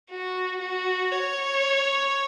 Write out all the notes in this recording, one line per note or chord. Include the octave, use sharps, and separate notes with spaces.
F#4
F#4
C#5